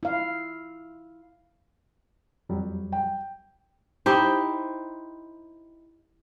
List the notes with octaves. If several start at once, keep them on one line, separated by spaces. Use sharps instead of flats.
E4 F5
F2 F#3 G3
G5
D#4 E4 G4 C5